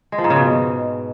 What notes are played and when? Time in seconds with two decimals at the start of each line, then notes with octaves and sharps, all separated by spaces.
0.12 G#3
0.18 F3
0.24 G#2
0.30 C#3
0.36 B2